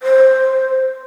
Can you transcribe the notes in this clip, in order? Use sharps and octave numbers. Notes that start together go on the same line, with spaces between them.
C5